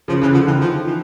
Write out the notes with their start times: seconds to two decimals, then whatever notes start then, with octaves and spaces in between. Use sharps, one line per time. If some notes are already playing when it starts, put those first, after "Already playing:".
0.08 C#3 F3
0.22 C#3 E3
0.34 D3 F3
0.47 D#3 E3
0.61 F3
0.87 E3